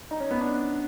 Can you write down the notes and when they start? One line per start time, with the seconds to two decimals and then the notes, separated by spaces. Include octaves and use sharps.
0.11 D#4
0.20 C#4
0.31 B3
0.40 D4